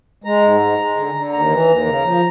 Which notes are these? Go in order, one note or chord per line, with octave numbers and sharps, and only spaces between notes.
G#3 A#5
G#2
G#3
G#3
D3
D3
D#2 A#5
E3
D#2
C#3
F3